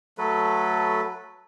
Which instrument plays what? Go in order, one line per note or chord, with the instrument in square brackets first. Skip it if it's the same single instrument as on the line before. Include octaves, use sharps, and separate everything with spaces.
[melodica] F#3 A3 A4 B4